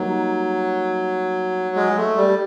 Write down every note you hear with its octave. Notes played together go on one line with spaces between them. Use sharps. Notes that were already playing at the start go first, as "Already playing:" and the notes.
Already playing: F#3 G3 A#3 D#4 G4 A#4
G#3
A3
G3